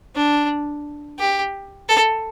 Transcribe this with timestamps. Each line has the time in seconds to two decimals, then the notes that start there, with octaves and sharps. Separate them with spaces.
0.15 D4
1.19 G4
1.88 A4